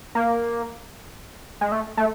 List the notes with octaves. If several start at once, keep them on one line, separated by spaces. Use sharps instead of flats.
A#3
G#3
A3
A3